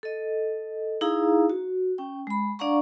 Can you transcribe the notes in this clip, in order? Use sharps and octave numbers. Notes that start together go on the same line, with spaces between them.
A4 D#5
D#4 E4 G#4 F5 A#5
F#4
C#4 G5
G#3 B5
D4 D5 F5 F#5 A#5 C#6